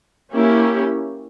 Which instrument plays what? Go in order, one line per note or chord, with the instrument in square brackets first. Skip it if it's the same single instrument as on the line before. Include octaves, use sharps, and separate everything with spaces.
[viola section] A#3 C#4 E4 G4